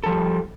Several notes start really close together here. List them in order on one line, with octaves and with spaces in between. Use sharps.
A4 F3 G3